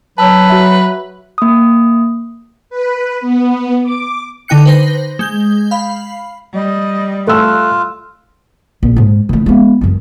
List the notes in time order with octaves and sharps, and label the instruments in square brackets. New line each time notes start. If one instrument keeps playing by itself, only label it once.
[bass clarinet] F#3 [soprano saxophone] B4 [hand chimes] A5 E6
[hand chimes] F#4 E5
A#3 D#6
[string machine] B4
B3
D6
[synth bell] D3 D#4 G5 F#6 C#7
B4 C5 A#6
G#3 G6 G7
F5 B5
[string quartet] G3 [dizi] D#5
[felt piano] A3 E6 [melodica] F4 [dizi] F#6
[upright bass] A#1
G#2 G#3
E3 A3
G#3 B3
F#2 E3